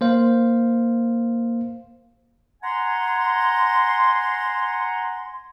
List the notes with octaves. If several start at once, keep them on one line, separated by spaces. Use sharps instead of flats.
A#3 C5 F5
F#5 G#5 A#5 C6